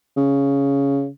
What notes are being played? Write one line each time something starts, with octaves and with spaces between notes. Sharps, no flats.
C#3